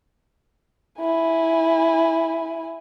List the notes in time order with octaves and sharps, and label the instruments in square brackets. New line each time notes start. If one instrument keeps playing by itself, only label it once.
[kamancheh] E4 G#5